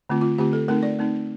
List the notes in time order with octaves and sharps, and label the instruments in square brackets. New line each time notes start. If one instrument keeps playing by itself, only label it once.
[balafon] D3 A3 C4 F4
F4
D3 A3 C4 F4 G4
A4
A3 C4 D#4 A#4
D5
A3 C4 D#4